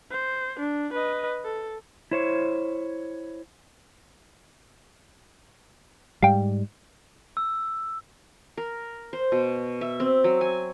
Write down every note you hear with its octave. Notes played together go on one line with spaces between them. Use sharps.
C5
D4
B4 D#5
A4
E4 C5 C#5
G#2 G3 F5 G5
E6
A#4
C5
B2
E5
C4
F#3
G#5